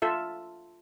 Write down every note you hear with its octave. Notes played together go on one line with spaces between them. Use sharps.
F4 A4 E5